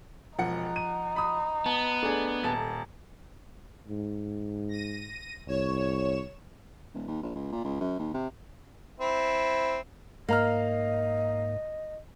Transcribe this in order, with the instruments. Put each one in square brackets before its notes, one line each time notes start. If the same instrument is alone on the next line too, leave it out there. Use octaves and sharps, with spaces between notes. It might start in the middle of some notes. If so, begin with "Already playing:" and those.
[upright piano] E1 [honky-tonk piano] F3 F#5 C#7 [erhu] D#4
[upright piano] D#7
B5 D#6
[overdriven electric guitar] B3 [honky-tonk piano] A5
[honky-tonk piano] A3 G#4 [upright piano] D4
[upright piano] D#1 A5
[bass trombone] G#2
[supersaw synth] A#6 D#7
[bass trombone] C2 [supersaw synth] C#5 E7
[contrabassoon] D#1
D#2
A#1
C#2
A#2
C#2
F#2
D#2
C3
[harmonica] C4 E4
[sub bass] G#2 [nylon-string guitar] A#3 [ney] D#5 [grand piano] F5 A#5 F6